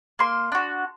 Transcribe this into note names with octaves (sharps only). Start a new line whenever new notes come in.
A#3 C6
D4 F#4